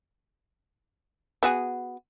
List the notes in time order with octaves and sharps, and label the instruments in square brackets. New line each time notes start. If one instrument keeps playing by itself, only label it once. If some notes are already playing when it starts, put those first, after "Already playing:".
[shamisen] B3 F#4 G#4